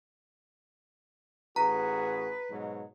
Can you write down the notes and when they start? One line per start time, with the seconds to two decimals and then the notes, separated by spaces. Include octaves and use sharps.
1.56 A1 F#4 G#4 B4 A#5
2.50 G#2 B2 F#3